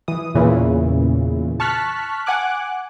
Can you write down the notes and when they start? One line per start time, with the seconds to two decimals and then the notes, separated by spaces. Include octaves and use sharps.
0.08 E3 D#6
0.35 E2 A#2 C#3 E3
1.60 A5 C#6 F6 F#6 B6
2.26 F#5 G#5 D6 F#6